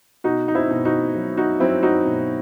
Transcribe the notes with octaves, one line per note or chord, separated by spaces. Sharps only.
B2 D#4 F#4
D#4
C4 E4
B2
D#4 F#4
F#3
D#4 F#4
F#3 C4 E4
D#4 F#4
B2